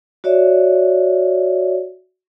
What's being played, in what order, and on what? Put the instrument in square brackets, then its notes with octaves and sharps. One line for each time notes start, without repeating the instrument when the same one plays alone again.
[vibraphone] F#4 C#5 D5 E5